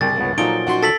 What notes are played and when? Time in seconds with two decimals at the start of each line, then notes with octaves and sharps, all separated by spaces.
0.01 C2 G2 C#3 G3 A#3 G4 G#4 A6
0.18 C#2 B3 C#5
0.38 A#2 F3 F#3 D#4 A4 D7 G7
0.67 C#4 D#4 F#4 F#5 C6
0.82 A4 A6 B6 F#7